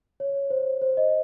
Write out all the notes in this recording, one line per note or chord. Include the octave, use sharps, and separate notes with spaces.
C#5
C5
C5
D#5